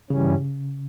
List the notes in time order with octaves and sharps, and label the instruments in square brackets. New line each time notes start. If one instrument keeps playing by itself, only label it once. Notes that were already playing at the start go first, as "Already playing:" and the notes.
[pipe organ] G2 E3 G3 C#4 [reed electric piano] C#3